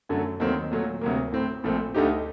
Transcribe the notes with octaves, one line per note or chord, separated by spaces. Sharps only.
F#2 D3 F#3 A3
D#2 D#3 F#3 A3 C4
A#2 F#3 A3
D2 C3 F#3 A#3
A2 A3 C4
A#1 A#2 A3 C4
D2 D3 A3 D#4 G4